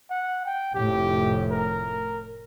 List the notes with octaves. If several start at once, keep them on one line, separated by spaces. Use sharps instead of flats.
F#5
G5
F1 A2 G4
A#4